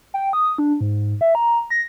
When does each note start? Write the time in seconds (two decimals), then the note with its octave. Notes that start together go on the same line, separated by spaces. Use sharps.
0.14 G5
0.33 D#6
0.58 D4
0.81 G#2
1.21 E5
1.35 A#5
1.70 A#6